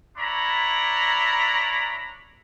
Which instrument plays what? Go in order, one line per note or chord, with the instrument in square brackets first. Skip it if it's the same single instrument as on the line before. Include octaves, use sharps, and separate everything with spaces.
[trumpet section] D4 E4 C#5 D5 A#5 B5